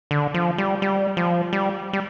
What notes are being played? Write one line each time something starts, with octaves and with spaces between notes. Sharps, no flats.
D3
F3
G3
G3
F3
G3
G3